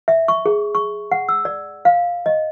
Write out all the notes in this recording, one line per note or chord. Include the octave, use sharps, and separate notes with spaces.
E5
C#6
G#4
C#6
F#5
E6
D5
F5
D#5